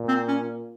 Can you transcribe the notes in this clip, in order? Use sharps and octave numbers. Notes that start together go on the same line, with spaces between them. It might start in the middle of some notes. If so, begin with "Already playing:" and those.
Already playing: A#2
C4
C#4